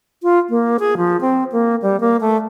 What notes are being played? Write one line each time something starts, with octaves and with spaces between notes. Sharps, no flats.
F4
A#3
G#4
F3
C4
A#3
G3
A#3
A3